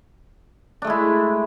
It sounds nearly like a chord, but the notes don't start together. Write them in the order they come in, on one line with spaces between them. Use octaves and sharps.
D4 A3 G#3 E4